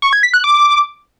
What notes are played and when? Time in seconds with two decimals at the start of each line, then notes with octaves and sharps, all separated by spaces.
0.02 C#6
0.13 G#6
0.23 B6
0.34 F#6
0.44 D6